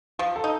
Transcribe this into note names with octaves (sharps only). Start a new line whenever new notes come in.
F3 F4
A4
D#4